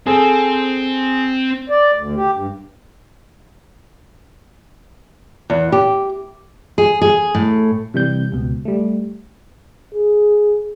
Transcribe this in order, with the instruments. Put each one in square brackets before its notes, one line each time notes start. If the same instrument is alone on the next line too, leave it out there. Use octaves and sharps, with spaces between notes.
[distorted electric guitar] C4 [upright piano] G#4 A4
[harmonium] D5
D2
G4
G2
[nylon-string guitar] E2
G4
[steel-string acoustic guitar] G#4
G#4
A2
[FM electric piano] C3 E3 G3 G6
C#2 B2
G3 A3
[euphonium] G#4